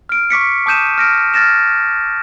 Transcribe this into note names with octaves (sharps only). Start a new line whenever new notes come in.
F6 D7
C#6 D6 B6 C#7
A5 D6 D#6 G6 D#7 E7
F6 A#6 D7
F6 A6 A#6 E7